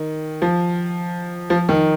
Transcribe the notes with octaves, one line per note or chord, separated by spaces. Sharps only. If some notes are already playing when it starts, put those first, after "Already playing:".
Already playing: D#3
F3
F3
D#3